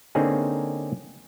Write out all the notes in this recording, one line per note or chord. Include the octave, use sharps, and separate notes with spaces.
D3 A#3 C4 C#4 D#4 G#4